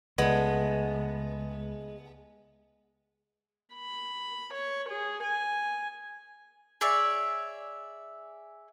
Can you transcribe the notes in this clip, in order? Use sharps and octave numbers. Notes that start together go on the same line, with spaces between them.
C#2 G#3 A3 B3
B5
C#5
G#4
G#5
G#4 C#5 D5 E5